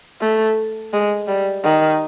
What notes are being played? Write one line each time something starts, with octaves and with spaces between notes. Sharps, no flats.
A3
G#3
G3
D#3